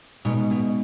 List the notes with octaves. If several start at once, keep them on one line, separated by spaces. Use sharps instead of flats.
B2 G#3 B3 D#4
B2